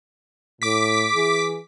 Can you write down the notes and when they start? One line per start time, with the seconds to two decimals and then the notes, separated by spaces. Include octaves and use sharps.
0.62 A2 D6 B6
1.14 E3 G#4